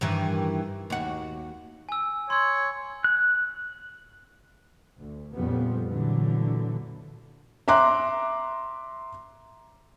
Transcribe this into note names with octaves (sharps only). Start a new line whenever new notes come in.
G2 D#3 E3
D#2 F#4
G#5 E6
C#5 C6 E6
F#6
D2
F2 A#2 C#3 F3 G3 B3
A#2 D3 E3 F#3
E5 A#5 C6 D6 F#6